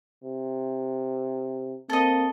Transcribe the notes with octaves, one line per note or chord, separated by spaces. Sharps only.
C3
A#3 C4 A4 D#5